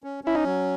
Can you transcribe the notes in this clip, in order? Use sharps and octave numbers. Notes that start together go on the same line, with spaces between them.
C#4
C#4 E4
D#4
F#3